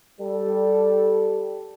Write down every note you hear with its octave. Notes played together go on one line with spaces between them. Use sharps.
G3 A4